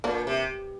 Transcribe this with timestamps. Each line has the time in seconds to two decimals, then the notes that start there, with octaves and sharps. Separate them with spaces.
0.04 A#2 A#3 D4
0.27 C3